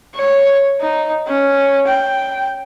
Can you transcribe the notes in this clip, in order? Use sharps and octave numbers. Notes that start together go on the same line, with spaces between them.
C#5
D#4
C#4
G5